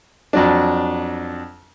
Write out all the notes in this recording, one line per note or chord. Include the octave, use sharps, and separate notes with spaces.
F2 F#3 D4